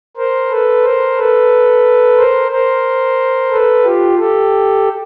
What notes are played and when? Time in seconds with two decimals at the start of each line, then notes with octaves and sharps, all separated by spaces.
0.16 A#4 C5
0.50 A4 B4
0.84 A#4 C5
1.17 A4 B4
2.18 A#4 C5
2.51 A#4 C5
3.51 A4 B4
3.84 F4 G4
4.18 G4 A4